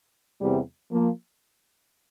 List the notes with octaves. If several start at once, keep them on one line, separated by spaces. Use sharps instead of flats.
E2 C3 G3
F3 A#3